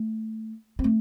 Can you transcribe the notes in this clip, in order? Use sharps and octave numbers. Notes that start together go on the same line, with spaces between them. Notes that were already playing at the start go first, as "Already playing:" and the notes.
Already playing: A3
C4
A3